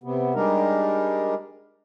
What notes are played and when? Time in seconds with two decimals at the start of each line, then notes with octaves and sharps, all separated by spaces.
0.04 C3 B3
0.35 G3 G#3 D4 D#4 A#4